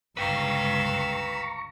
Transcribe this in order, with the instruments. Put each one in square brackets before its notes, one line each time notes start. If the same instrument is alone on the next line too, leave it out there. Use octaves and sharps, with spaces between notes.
[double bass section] G1 C#2 [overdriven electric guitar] B4 G5 [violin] F5 E6 [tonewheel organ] A#5 C#6